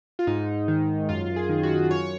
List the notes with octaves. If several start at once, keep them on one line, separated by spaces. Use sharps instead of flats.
F4
G#2 D#4
D#3
F#2 F4
G#4
D#3
F#4
F#2 C#5